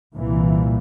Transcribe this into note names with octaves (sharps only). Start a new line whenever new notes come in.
C2 A#2 E3